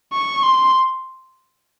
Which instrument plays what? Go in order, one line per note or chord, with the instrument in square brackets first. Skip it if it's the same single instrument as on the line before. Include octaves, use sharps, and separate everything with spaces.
[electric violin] C#6
C6